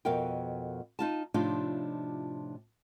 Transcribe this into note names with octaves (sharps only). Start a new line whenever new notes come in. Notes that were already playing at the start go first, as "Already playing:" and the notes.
F2 B2 B3 A#4 F5 G5
D#4 F4 A5
A2 C3 F3 D4 D#4 F4